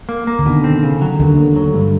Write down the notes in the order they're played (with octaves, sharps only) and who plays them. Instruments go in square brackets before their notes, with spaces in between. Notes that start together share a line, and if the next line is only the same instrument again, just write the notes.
[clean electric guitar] A#3
A#3
[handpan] D3
[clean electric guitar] B2 [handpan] D#3
[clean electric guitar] C4
C#3
F#3
[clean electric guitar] D#2 [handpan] D3
[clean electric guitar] D#2
F#3
G2